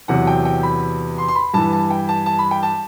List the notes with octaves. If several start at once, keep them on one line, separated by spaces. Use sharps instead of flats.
E2 C3 F#3 F#5
G5
G5
B5
C6
C6
B5
G2 E3 A5
A5
G5
A5
A5
B5
G5
A5